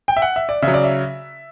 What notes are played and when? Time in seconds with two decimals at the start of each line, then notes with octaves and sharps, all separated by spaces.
0.08 G5
0.17 E5
0.22 F#5
0.36 E5
0.49 D5
0.62 C#3 E5
0.68 F#3
0.74 D5
0.84 E5